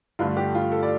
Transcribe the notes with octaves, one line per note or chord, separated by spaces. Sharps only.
G2 D3 A3 F4
G4
F4
A4
D5